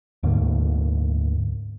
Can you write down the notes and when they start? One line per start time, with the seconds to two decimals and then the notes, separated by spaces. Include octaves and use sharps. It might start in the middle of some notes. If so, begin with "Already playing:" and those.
0.23 D2 G#2 D3 A#3